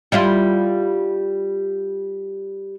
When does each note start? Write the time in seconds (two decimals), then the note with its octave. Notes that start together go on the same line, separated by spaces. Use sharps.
0.12 G3 E4 F4